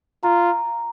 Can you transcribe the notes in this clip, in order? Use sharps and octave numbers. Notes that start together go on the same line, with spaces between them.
F4 A#5